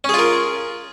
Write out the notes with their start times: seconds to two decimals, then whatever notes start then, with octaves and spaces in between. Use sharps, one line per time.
0.04 C#4
0.09 G#4
0.14 F4
0.19 A#4